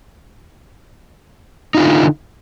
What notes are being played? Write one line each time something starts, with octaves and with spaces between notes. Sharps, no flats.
D3 D#4 F4